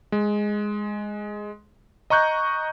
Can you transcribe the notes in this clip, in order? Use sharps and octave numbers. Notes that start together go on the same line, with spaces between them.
G#3
D#5 A#5 C#6 F#6 G6